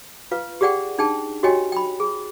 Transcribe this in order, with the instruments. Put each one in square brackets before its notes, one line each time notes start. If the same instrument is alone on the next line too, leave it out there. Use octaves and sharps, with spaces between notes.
[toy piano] F4 B4 F5
G4 G#4 D5 F#5 G5
D4 D#4 G#4 G5 A5
F#4 G4 C#5 D#5 G5 G#5
G5 B5
G#4